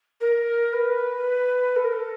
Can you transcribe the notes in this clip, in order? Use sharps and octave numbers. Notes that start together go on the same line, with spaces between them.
A#4
B4
A4
A#4
A4